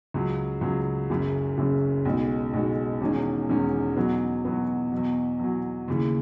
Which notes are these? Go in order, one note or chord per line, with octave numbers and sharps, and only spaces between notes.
C#2 C#3 F#3
C#2 C#3 F#3
F#1 F#2 C#3
F#1 F#2 C#3
B1 B2 G#3 D#4 F#4
B1 B2 G#3 D#4 F#4
E1 E2 D#3 G#3 C#4
E1 E2 D#3 G#3 C#4
E2 B2 F#3 B3
E2 B2 F#3 B3
E2 B2 F#3
E2 B2 F#3
D#2 C#3 E3